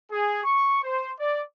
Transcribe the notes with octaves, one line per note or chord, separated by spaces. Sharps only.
G#4
C#6
C5
D5